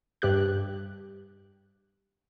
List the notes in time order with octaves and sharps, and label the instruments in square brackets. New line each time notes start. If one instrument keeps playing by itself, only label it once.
[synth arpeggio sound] G2 G4 F#6